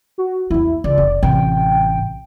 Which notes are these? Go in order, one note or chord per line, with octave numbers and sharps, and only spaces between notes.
F#4
E2 A#3 E4
C#2 D5
F1
A1 C3 G5